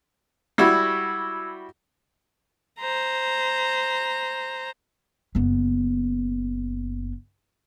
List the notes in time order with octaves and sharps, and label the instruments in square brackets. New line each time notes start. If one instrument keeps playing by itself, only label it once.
[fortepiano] G3 E4 F#4 [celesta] E6 G#6
[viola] C5 A#5
[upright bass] F#1 B3